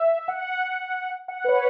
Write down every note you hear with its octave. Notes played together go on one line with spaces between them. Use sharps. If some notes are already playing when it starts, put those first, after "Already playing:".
Already playing: E5
E5
F#5
F#5
B4
C#5